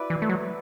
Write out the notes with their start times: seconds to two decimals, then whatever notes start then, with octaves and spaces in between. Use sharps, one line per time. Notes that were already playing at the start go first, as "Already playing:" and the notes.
Already playing: E4 F#4 B4 D5
0.10 E3
0.22 A3
0.29 F#3